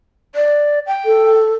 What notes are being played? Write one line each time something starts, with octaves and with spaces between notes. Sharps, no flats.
D5
G5
A4